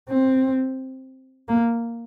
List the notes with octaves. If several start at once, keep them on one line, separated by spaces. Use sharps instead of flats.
C4
A#3